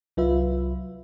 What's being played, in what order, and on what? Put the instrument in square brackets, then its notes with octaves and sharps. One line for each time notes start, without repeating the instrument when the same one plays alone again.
[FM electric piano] C2 F#3 F4 B4 E5